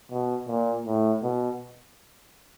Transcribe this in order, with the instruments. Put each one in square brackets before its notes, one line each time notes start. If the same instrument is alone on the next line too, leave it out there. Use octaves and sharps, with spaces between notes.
[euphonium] B2
A#2
A2
B2